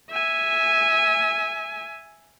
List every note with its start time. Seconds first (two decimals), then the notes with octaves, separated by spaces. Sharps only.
0.11 E5 G#5